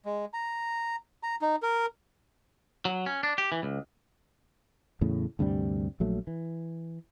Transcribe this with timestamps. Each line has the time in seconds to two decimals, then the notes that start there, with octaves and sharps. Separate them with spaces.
0.05 G#3
0.33 A#5
1.23 A#5
1.42 D#4
1.63 A#4
2.85 F#3
3.06 C#4
3.23 D4
3.38 G4
3.52 E3
3.63 C#2
5.01 E2 A2 C#3
5.39 D2 G2 C3 G3
6.00 A#1 F#3 A3
6.27 E3